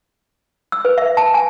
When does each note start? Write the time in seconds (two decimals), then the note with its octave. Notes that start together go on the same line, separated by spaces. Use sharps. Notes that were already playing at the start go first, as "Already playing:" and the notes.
0.72 E6
0.85 B4
0.98 E5
1.17 A5
1.34 G#5